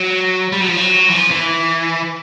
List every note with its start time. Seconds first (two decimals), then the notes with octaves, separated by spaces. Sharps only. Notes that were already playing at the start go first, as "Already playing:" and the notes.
Already playing: F#3
0.52 G3
0.61 F#3
0.68 F3
0.77 F#3
1.09 E3
1.15 F3
1.31 E3